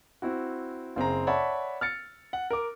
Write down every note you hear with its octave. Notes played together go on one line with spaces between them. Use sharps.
C4 E4 F#4
F#1 C4 G#4 A#5
C#5 D5 E5 F#5 A5 B5
F6 A6 C#7
F#5
A#4 D6